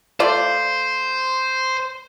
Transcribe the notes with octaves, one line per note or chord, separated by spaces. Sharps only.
A3 F4 C5 D5